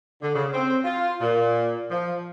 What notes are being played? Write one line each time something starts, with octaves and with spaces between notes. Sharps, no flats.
D3
C#3
C4
F4
A#2
F3